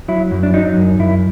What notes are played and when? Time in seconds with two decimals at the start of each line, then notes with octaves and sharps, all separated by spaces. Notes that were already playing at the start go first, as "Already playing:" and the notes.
0.08 F#3 E4
0.31 F#2
0.43 D4
0.54 F#3 D#4
0.77 F#2
0.99 F#2 E4